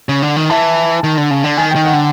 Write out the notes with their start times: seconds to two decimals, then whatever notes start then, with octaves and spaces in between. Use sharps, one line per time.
0.09 C#3
0.22 D3
0.36 D#3
0.50 E3 A5
1.04 D#3
1.18 D3
1.31 C#3
1.44 D3
1.57 D#3 G#5
1.71 G5
1.75 D#3
1.85 F#5
1.93 D3